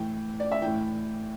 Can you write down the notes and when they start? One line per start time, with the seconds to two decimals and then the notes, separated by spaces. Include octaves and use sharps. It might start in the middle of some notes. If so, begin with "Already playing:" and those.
Already playing: A2 E3 G5
0.40 D5
0.52 E5
0.62 A2 E3 G5